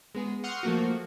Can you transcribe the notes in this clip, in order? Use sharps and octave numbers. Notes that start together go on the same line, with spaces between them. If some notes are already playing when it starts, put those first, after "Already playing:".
G#3 B3 G#4
F#5 C6 C#6 D#6 F6 G6
F3 A3 A#3 F#4